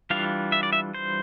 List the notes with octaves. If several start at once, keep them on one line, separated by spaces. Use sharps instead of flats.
E3 G3 D4 F4 F5
E5
D5
E5
C5